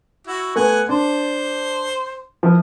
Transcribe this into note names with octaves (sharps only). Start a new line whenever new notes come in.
E4 F#4
A3 B3 F#5 G#5
D4 C5
F3 E4